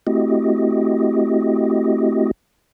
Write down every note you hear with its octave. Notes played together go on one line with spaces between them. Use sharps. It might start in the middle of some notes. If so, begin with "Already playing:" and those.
A3 C4 E4 F#4 G4 D#5